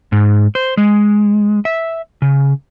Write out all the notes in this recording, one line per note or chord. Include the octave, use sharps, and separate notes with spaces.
G#2
C5
G#3
E5
C#3